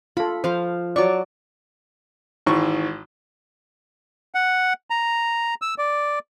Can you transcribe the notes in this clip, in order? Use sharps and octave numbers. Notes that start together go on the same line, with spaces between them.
F4 A4 B5
F3 C5 F5
F#3 D5 C#6
G#1 G#2 E3 C#6
F#5
A#5
E6
D5